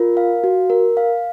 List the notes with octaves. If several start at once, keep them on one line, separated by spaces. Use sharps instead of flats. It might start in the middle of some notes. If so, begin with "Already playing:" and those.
Already playing: F4 A#4
F5
F#4
A#4
F5